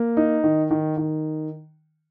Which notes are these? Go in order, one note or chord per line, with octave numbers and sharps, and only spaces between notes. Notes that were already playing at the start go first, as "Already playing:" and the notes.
Already playing: A#3
D#4
D#3
D#3
D#3